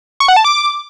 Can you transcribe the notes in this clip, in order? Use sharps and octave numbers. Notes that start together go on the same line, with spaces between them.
C#6
F#5
A5
D6